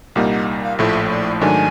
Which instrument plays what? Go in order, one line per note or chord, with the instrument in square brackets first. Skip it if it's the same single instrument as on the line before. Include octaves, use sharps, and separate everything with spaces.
[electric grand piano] C2 A#2 G3 A#3 D#4 [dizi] F#5
[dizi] F#5
F5
[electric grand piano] A#1 A2 F3 A3 [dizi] E5
[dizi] D5
[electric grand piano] G#2 D#3 F#3 A3 D4 [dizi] G#5